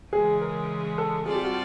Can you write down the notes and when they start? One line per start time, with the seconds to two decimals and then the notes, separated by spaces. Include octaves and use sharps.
0.13 C#3 E3 G#3 G#4
0.41 A#4
0.98 A4
1.26 G3 C4 F4 G#4 A4 D5
1.35 G4
1.44 F#4